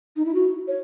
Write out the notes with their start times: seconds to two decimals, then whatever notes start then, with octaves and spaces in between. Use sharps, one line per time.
0.16 D#4
0.25 E4
0.35 F#4
0.68 C#5